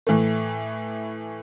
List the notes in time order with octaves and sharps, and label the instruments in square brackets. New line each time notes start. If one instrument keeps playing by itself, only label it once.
[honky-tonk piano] A2 E3 A3